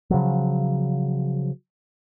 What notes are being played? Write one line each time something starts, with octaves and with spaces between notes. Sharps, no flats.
C#3 F3 F#3